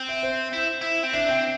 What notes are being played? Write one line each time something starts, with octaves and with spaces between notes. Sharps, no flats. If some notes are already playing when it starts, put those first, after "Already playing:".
Already playing: C4
E5
C5
E4
E4
C4
D4 E5
C4 G5